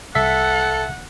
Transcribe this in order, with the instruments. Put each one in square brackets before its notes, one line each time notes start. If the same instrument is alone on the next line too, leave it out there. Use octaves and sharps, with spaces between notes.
[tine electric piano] C2 E5 B6 [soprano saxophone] A4 [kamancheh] F#5